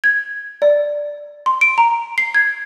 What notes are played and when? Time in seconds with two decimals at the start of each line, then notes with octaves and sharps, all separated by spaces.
0.04 G#6
0.62 D5
1.46 C6
1.61 D7
1.78 A#5
2.18 C7
2.35 G#6